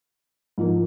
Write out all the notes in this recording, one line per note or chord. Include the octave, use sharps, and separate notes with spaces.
G#2 F3 A#3